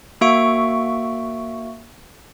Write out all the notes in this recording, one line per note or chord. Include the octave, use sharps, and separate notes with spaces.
A#3 F#4 E5 C#6 D7